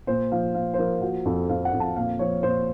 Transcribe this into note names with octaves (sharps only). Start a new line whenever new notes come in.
A#2 C5
F3 F5
A#2 F5
C5
F3 A#4
F3 F#4
F2 A4
F2 F5
F#5
F2
A5
A#2 F5
F3 C#5
A#2 C5